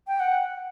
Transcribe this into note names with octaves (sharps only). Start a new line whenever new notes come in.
G5
F#5